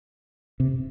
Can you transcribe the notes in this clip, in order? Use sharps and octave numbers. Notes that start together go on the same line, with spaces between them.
C3